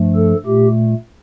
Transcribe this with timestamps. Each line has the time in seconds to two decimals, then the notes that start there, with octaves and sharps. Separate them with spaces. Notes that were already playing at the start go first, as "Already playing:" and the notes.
Already playing: G2 F3 A3
0.15 A4
0.46 A#2 A3 G4